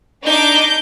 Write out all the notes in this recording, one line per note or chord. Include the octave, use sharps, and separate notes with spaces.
D4 D#4 D6 G6